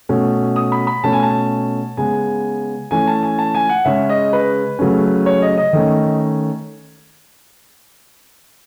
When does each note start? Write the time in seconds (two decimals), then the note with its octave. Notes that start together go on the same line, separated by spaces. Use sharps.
0.09 B2 A3 C#4
0.56 D#6
0.72 B5
0.87 B5
1.03 B2 A3 C#4 A5
1.13 G#5
1.23 A5
1.97 C#3 G#3 B3 G#5
2.91 E3 A3 C#4 G#5
3.08 A5
3.23 G#5
3.39 A5
3.55 G#5
3.69 F#5
3.85 C#3 G#3 C#4 E5
4.09 D#5
4.33 B4
4.79 C#3 F#3 A3 C#4
5.26 C#5
5.42 D#5
5.57 D#5
5.73 D#3 A3 C#4